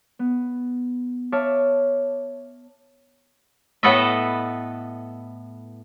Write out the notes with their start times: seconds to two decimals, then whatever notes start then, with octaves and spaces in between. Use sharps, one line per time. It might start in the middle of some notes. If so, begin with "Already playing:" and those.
0.19 B3
1.32 C#5 E5 A5 D6 F6
3.83 A2 B3 A4 B4 D#5 E5